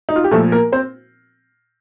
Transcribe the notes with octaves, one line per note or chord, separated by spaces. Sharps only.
D#4
F4
G4
A#2 F3 A3 A4
A#3 A#4
C4 C5